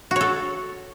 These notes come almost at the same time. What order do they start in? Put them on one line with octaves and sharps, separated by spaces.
F#4 C#5 A4